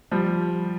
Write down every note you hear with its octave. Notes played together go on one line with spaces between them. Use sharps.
F3 G3